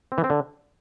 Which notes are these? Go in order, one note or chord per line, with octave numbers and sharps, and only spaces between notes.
C4
E3
C4
D3